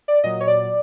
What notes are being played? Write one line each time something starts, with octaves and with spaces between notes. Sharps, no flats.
D5
A#2 F#3 D#5
C#5
D5